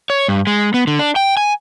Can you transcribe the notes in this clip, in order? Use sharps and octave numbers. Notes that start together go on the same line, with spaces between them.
C#5
G2
G#3
B3
D3
D4
G5
G#5